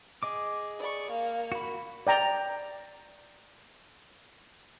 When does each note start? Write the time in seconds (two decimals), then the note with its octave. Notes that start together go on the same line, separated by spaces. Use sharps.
0.23 G#4 D#5 D6
0.79 D5 C#6
1.11 A#3 F5
1.52 F#4 B5
2.07 D5 G5 A#5